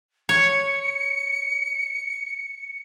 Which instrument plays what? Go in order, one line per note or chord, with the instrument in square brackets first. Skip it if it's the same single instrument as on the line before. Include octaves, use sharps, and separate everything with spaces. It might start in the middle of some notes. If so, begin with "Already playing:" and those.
[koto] C#5 [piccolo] C#7